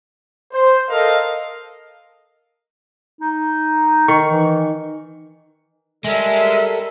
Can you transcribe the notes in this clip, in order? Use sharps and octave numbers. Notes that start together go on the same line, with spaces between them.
C5
A4 A#4 D#5 F5
D#4
D#3 C#6
E3
G3 G#3 A4 A#4 E5